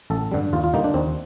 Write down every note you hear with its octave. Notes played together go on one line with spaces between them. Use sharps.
A1 A4
G2 D3 G3
D#2 F4
F4
D3 G3 A#3 D#4
D4
D#2 C4